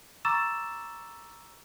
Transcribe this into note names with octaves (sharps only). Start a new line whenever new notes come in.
A#5 C#6 D6 E6 A6 E7